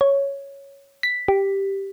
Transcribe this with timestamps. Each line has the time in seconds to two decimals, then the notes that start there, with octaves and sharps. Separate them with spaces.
0.01 C#5
1.03 B6
1.28 G4